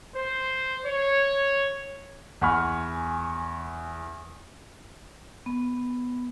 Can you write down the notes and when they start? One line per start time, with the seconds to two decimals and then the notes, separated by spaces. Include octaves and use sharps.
0.16 C5
0.85 C#5
2.41 E2 F#5 G#5 B5 C#6 F6
5.46 B3